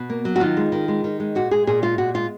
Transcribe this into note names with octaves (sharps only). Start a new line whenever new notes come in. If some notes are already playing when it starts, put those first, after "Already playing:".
Already playing: B2
A#3
F#3
F#4
D#3 F4
G#3
D#3
G#3
D#3
G#3
A#2 F#4
G#3 G#4
A#2 G#4
G#3 F4
A#2 F#4
G#3 F4